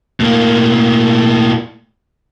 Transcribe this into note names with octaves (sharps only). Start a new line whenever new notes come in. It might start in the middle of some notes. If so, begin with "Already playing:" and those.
A2 A#3